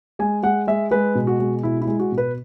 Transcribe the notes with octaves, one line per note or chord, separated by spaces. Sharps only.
G#3 G#5
G#3 F#5
G#3 E5
G#3 B4
B2
F#4
G#3
B2 E4
E4
G#3
F#4
B2
B4